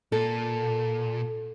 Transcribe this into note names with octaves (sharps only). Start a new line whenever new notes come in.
A#2 A4